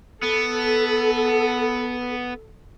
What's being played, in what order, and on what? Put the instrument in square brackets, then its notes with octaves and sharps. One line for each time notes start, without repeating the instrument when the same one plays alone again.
[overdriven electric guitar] B3 [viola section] A4